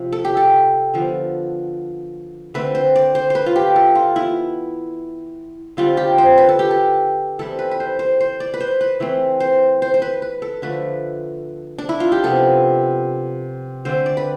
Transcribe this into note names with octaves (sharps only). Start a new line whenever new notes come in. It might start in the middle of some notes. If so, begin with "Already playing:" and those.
Already playing: C3 F3
A4
G4
A4
D3 F3 B3
D3 A3 C4 B4
C5
D5
C5
B4 C5
F4
G4
A4
F4
E3 B3 E4
D3 G3 C4 F4
G4
C5
B4
A4
G4
A4
E3 G3 C4 A4
B4
B4
C5
C5
C5
D5
B4
C5
B4
E3 A3 C4
C5
C5
C5
B4
B4
A4
D3 F3 A3 B4
D4
E4
F4
G4
C3 F3 B3 A4
D3 A3 C4 C5
D5
B4